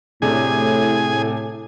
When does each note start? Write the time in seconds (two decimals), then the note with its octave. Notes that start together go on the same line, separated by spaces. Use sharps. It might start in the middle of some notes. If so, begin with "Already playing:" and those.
0.22 A2 C3 A3 D4 G#4 G#5